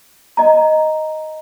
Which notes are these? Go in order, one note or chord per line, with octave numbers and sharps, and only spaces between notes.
D#5 A#5